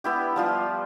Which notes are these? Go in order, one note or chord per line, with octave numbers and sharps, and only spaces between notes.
B3 E4 G4
F3 G3 F4